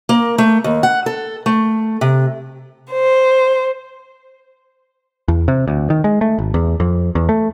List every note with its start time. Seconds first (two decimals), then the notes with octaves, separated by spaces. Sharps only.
0.09 A#3
0.38 A3
0.64 D#2
0.83 F#5
1.06 A4
1.46 A3
2.01 C3
2.91 C5
5.28 E2
5.48 C3
5.68 D2
5.90 D#3
6.04 G#3
6.21 A3
6.39 G#1
6.54 E2
6.80 F2
7.15 E2
7.29 A3